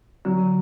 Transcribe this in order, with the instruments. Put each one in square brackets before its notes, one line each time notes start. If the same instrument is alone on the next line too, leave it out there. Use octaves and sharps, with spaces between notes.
[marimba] D3 [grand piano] F#3